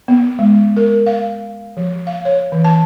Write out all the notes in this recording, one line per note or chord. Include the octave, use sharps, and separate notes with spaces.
B3
G#3
A#4
F5
F3
F5
C#5
E3
A5